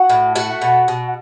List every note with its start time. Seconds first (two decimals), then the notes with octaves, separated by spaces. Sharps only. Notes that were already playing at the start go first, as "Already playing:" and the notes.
Already playing: F#4 F#5
0.10 A2
0.35 A3 F#4 F#5
0.62 B2
0.88 B2